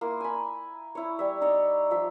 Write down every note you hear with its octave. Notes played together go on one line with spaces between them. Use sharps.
A#3 E4 C6
G#5 B5
E4 C#5
G3 E5
D#4 C#5 D5 E5
F3 E5